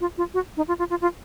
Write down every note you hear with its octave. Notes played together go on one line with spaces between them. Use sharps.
F4
F4
F#4
D#4
F4
F4
F4
F4